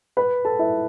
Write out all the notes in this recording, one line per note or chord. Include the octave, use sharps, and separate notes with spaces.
B4 B5
A4 A5
E4 E5